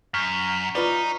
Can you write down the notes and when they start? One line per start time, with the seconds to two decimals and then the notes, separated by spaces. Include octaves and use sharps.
0.14 F#2 C#6 F6 B6
0.75 D#4 F4 B4 D5